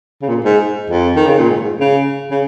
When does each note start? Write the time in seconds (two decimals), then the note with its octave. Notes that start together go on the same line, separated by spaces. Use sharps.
0.22 C#3
0.29 A#2
0.45 G#2
0.90 F2
1.16 D#3
1.27 C#3
1.38 A#2
1.50 G#2
1.65 G#2
1.80 C#3
2.31 C#3